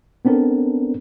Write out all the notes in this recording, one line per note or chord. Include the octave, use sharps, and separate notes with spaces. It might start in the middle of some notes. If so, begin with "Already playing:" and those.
B3 C4 D4 A4 A#4